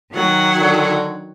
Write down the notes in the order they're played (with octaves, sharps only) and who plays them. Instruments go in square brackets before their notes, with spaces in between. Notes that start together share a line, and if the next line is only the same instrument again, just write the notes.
[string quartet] D#3 F#3 F#5
[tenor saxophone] D3